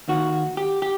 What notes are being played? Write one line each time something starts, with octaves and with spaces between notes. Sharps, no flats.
D#2 D#3 F#4
G4
G4